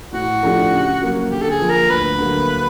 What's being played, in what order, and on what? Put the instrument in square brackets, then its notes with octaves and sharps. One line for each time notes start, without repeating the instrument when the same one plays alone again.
[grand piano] A2 [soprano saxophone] F#4
[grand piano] F3 A3 D4 G4
C#3
F#3 A#3
[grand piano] D3 [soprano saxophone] G4
[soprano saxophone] A4
G#4
[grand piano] F3 A#3
[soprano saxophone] A#4
[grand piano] D2 [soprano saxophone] B4
[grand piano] D3 F#3 A#3